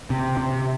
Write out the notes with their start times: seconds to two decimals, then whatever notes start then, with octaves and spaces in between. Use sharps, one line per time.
0.10 C3
0.37 C3